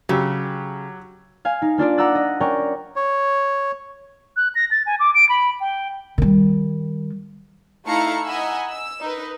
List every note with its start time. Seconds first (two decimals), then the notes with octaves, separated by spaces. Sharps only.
0.09 C#3 F#3 G4 E6
1.45 F5 G#5
1.62 D#4
1.78 A#3 D4 F4 D5
1.97 F#5 A#5 D6 E6 F#6 A6
2.15 D#5
2.40 C#4 A#4 D5 G5 A#5 C#6
2.96 C#5
4.36 F#6
4.55 A#6
4.71 A6
4.86 G#5
5.00 D6
5.15 D7
5.29 B5
5.60 G5
6.18 D#3 G3
7.86 A3 D#4 E4 F5 A#5 C#7
8.24 D#5 F#5 G#5 A#5 B5 E6
8.67 E6
9.01 D#4 A#4 B4